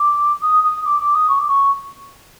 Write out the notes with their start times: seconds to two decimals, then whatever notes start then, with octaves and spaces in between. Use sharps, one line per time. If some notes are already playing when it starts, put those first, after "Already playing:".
Already playing: D6
0.41 D#6
0.63 D#6
0.85 D6
1.00 D6
1.14 D#6
1.28 C#6
1.38 D6
1.48 C#6